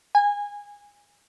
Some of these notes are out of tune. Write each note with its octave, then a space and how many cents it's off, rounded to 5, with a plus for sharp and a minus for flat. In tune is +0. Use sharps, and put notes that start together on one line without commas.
G#5 -20